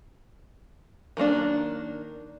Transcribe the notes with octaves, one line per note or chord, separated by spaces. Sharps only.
D#3 F#3 A#3 D4